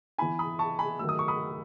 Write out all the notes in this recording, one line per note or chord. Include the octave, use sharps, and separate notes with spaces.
E3 B3 E4 G#5 B5
B5 D#6
A5 C#6
G#5 B5
D#3 F#3 A3 E6
D#6
C#6
B5 D#6